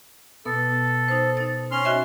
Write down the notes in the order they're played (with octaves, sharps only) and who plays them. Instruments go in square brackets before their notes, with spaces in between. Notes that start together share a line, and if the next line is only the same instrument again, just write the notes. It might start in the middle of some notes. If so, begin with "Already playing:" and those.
[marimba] B2 B3 [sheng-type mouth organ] A4
[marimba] D#4 C5
D#4 A6
[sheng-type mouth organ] C#4 C6 F6
[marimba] F#4 D#5 E5